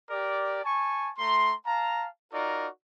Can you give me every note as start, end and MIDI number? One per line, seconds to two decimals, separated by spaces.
0.10 0.63 67
0.10 0.63 70
0.10 0.63 74
0.64 1.10 80
0.64 1.10 81
0.64 1.10 85
1.17 1.53 57
1.17 1.53 82
1.17 1.53 84
1.65 2.06 77
1.65 2.06 81
1.65 2.06 82
2.32 2.67 63
2.32 2.67 65
2.32 2.67 66
2.32 2.67 70
2.32 2.67 74